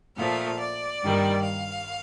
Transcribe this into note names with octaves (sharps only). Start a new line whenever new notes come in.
A#2 F3 A3 F5
D5
G2 D#3 G3 A#3
F5